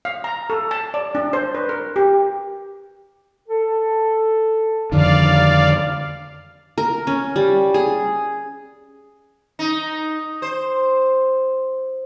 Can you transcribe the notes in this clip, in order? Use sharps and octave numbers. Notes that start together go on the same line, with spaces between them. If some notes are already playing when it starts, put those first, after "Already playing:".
F5
A#5
A4
A5
D5
D4
C5
B4
A#4
G4
A4
F2 D3 D#3 D5 F5
A#4
C#4
G3
G#4
D#4
C5